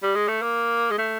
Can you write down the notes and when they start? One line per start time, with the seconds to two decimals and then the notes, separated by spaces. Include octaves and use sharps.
0.02 G3
0.15 G#3
0.28 A3
0.42 A#3
0.91 G#3
0.98 A3